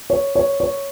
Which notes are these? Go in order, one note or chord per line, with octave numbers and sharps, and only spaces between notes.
C#5
C#5
C#5